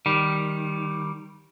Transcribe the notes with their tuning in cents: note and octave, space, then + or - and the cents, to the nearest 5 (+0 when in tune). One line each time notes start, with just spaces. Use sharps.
D#3 +0 G3 +0